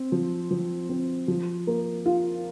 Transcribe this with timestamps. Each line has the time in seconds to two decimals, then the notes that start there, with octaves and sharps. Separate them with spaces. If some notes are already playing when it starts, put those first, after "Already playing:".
Already playing: C4
0.12 F3
0.51 F3
0.89 C4
1.28 F3
1.67 A#3
2.06 F4